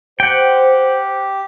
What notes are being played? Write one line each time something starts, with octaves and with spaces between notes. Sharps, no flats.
G4 C5 F#5 G5